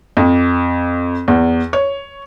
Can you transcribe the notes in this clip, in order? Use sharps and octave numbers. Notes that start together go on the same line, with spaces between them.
F2
E2
C#5